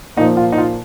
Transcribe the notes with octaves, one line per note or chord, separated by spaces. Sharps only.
A#2 F3 A#3 D#4
F4
D#4
F4